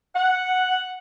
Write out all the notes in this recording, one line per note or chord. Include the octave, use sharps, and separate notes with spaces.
F#5